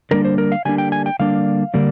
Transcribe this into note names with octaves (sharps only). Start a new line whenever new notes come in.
D3 G3 A#3 D4 A#4
C5
A#4
F5
D3 G3 A#3 D4 G#5
G5
G#5
G5
D3 G3 A#3 D4 F5
D3 G3 A#3 D4